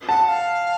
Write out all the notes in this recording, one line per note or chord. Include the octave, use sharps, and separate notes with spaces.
F#5 A5
F5